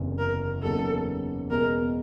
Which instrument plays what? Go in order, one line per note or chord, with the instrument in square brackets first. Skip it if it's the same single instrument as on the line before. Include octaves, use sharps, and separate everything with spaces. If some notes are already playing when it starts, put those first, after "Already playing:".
Already playing: [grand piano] F#1 E2 C3
[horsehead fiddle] A#4
[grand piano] E2 C#3 F#3 A#3 D#4 [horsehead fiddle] A4
[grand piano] E2 B2 G#3 B3 [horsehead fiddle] A#4